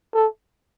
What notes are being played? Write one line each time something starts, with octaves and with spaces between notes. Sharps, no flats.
A4